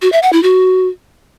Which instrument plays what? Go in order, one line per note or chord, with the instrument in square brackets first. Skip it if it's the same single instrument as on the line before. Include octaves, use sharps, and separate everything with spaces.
[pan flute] F#4
E5
F#5
E4
F#4